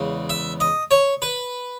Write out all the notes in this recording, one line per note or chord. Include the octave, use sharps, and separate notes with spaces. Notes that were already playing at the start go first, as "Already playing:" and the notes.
Already playing: E2 C#3 G#3
E5
D#5
C#5
B4